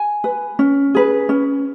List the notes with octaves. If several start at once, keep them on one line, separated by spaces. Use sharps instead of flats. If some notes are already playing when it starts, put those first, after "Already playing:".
Already playing: G#5
B4
C#4
G#4 B4
C#4